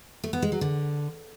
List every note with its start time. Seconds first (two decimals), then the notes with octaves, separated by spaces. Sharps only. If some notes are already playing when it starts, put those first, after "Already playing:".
0.24 A3
0.33 B3
0.42 G#3
0.52 F#3
0.61 D3